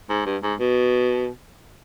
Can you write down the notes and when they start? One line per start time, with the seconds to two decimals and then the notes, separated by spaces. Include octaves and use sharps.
0.09 G#2
0.26 G2
0.43 G#2
0.59 B2